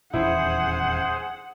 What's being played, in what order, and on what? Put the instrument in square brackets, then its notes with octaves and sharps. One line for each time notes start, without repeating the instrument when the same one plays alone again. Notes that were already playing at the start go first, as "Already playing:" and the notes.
[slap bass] D#1 E2 C#4 [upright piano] E4 [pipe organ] G#4 C5 [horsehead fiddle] F#5